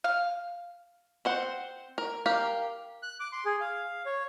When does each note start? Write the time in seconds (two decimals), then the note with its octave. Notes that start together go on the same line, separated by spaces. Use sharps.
0.04 F5
1.25 C4 C5 F#5
1.98 A#4
2.26 G4 A#4 F5
3.03 F#6
3.20 D6
3.32 C6
3.45 G#4
3.60 F5
4.06 C#5